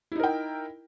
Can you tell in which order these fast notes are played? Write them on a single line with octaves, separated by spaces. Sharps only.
E4 D#4 A#4 G5